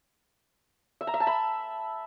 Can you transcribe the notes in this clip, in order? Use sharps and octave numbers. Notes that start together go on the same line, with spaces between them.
E5
A#5
E5
A5
B5